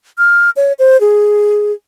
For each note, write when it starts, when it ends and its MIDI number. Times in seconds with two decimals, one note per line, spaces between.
0.18 0.50 89
0.56 0.73 73
0.79 0.99 72
1.00 1.72 68